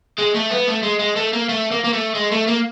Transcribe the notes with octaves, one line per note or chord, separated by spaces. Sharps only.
G#3
A3
B3
A3
G#3
G#3
A3
A#3
A3
A#3
A#3
A3
G#3
A3
A#3